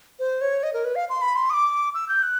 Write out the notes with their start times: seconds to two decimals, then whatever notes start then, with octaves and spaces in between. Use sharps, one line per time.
0.19 C5
0.41 C#5
0.63 D#5
0.73 A#4
0.84 B4
0.95 F5
1.09 C6
1.21 B5
1.36 C6
1.50 D#6
1.53 D6
1.94 E6
2.09 G6
2.23 F#6